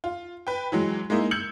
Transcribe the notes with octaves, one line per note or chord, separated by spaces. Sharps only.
F4
B4 G5
E3 F#3 G#3
G#3 A#3 D#4 E4
E6 G6 G#6 C#7 F#7